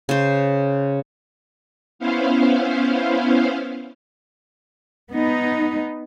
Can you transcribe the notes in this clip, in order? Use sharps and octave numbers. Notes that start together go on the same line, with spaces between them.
C#3 C5
B3 C#4 E4 C5 F5
B3 D#4